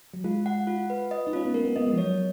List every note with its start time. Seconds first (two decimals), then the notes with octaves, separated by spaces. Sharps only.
0.14 F#3
0.24 G#3 F4
0.46 F#5
0.67 F4
0.90 B4
1.11 D#5
1.27 D#4
1.33 C#4 F4
1.45 B3
1.54 A#3 A#4
1.65 B3
1.76 B3 D#5
1.87 G#3
1.93 F3
1.98 F#3 C#5